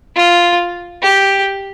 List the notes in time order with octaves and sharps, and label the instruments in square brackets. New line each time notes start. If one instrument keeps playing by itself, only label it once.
[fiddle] F4
G4